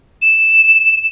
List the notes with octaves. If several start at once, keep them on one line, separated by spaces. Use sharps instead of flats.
E7